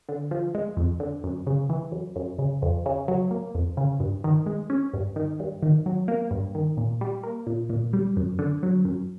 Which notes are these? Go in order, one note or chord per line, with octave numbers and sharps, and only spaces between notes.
D3
F3
G#3
F2
D3
F#2
C#3
E3
F#2
F#2
C#3
F2
C#3
F#3
A#3
F2
C#3
G2
D#3
G#3
C#4
G2
D#3
G2
D#3
F#3
A#3
G2
D#3
A#2
G3
A#3
A#2
A#2
G3
F#2
D3
F#3
F#2